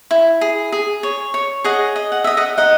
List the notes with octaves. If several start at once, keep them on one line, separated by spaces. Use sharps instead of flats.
E4
G#4
G#4
C#5
C#5
G#4 D#5 F#5
D#5
F#5
D#5 E5
D#5 F#5
D#4 D#5 F#5